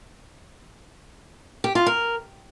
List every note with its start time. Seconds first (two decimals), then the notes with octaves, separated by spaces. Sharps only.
1.64 G4
1.75 F4
1.86 A#4